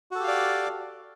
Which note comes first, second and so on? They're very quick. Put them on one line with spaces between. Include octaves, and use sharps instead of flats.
F#4 A4 G4 F5 D5